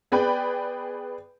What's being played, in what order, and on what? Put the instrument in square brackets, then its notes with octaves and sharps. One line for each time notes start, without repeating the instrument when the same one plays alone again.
[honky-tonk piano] B3 G#4 B4 D5 G5 B5